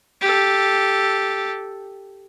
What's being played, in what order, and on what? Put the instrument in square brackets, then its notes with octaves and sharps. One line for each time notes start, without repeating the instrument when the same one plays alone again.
[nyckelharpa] G4 A4